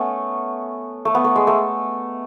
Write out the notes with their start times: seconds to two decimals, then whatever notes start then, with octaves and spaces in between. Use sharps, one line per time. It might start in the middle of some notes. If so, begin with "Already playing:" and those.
Already playing: A3 B3 C#4
1.05 A3
1.15 B3
1.24 A3
1.36 G#3
1.47 A3